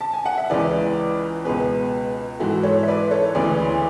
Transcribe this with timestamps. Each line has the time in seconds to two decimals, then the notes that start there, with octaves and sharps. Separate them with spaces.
0.01 A5
0.13 G#5
0.26 F#5
0.37 E5
0.50 C#2 C#3 E3 B4 D5
1.45 C#2 B2 G#4 B4
2.39 G#2 E3 F#4 A4
2.63 A4 C#5
2.83 E5
2.88 B4 D5
3.11 A4 C#5
3.35 D2 C#3 E3 B4 D5